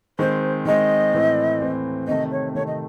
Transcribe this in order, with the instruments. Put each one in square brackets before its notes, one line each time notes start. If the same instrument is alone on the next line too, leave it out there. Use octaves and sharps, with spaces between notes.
[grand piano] D#3 G#3 C4 [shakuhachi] C5
[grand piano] D#3 G#3 C4 [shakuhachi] D#5
[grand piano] A2 E3 C4
A2 E3 C4
[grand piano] C3 D#3 A3 [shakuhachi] D#5
[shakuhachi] C#5
[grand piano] C3 D#3 A3 [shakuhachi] C#5
[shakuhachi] D#5